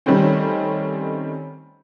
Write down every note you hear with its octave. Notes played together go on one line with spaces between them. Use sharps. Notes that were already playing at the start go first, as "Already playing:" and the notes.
D#3 G3 A3 C4 C#4